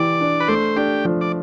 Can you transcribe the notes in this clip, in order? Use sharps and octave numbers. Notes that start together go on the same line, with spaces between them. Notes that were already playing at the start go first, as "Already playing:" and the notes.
Already playing: E3 G4 D5
D4
B4
A3 C5
D4 G4
F3
D5